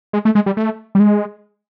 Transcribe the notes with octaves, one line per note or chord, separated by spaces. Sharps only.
G#3
A3
G#3
G3
A3
G3
G#3